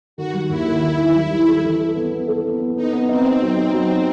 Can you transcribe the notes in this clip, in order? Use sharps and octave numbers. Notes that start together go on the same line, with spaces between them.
D#3 F#4
G3
D#2 E4
D#3
D#3
D#3
G3
G3
A4
E3
A4
B3
B3
A4
B3
B3
B3 D#4
B3
C4 D#4
D#4
F#3 C4
D#4
F#3
D#4